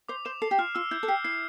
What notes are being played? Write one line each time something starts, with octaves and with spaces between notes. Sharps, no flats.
C5 D6
C5 E7
A4 C7
G4
F4 F6
F4 E6
E4 G6
A4
G4 C7
E4 C7